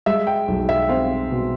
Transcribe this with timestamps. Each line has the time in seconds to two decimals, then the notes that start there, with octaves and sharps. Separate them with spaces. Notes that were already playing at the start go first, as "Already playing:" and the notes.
0.06 G#3 E5
0.27 G5
0.48 B1
0.69 E5
0.89 C4 F5
1.31 B2